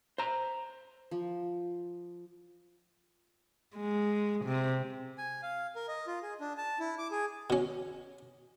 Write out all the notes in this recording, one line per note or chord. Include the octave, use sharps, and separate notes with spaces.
C5 A#5
F3
G#3
C3
G#5
F5
A#4
D#5
F4
G#4
D4
A5
E4
D6
G#4
B2 C#4